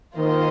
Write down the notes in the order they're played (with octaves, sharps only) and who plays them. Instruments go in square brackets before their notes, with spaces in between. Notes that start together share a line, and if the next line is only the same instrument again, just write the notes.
[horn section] D#3 [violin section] A#3 F4 C5 D#5